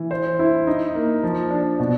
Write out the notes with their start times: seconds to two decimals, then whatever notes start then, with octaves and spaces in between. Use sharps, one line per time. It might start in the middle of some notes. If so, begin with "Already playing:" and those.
Already playing: E3
0.11 C5
0.39 E4
0.67 D#4
0.95 A#3
1.23 F3
1.50 D4
1.80 B2